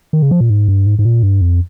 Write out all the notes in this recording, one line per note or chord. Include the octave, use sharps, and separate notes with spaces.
D#3
C#3
F3
A#2
G#2
G2
G#2
G#2
A#2
G2
F2